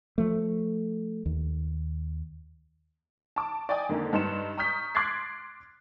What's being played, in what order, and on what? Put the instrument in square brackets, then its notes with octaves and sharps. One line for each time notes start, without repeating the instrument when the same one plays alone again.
[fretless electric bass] F3 A3
D#2
[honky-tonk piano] A5 D6
D5 D#5 G5 G#5 D#6
F2 D3 D#3 A#3 D#4
G2 D#4 B4 C6 C#7 E7
A#5 C#6 D#6 F6 G6 B6
C6 D6 F#6 G#6 A6 C7